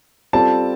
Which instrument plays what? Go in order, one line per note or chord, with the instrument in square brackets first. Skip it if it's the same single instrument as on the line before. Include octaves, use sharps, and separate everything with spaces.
[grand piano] G3 C4 F4 A4 D5 [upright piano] A5